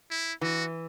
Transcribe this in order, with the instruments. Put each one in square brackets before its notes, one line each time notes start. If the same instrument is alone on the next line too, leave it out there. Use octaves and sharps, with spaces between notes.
[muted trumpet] E4
[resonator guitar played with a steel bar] E3 [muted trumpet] F#4